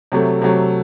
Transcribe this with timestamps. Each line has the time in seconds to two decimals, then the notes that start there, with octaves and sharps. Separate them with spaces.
0.12 C3 F#3 A3
0.42 C3 F#3 A3